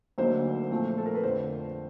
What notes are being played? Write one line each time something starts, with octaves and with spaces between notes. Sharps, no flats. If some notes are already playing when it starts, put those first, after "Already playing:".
D2 D3 F#3 A#3 D#4 C5
A#2 F3 A3 C4
A4
A#4
B4
F2 D3 F3 A3 C5